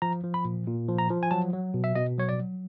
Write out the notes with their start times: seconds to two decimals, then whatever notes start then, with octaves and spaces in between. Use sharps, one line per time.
0.02 F3 A#5
0.24 F3
0.34 B5
0.45 A#2
0.67 A#2
0.89 F3
0.98 A#5
1.10 F3
1.23 G#5
1.31 F#3 A5
1.53 F#3
1.74 B2
1.84 E5
1.95 B2 D#5
2.18 F#3 C#5
2.29 D5
2.40 F#3